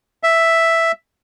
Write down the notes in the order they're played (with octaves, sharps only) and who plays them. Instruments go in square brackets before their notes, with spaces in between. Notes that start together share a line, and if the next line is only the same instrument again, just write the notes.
[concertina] E5